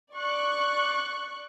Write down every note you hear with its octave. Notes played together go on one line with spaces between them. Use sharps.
D5 C#6 F#6